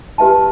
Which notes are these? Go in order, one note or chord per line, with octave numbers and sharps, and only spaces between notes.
G4 B4 E5 A5